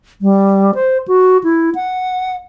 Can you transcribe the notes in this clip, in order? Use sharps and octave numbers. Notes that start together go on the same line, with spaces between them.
G3
C5
F#4
E4
F#5